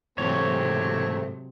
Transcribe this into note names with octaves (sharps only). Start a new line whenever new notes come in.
G#2 C3 E3 F#3 G#3 A3 C4 C#5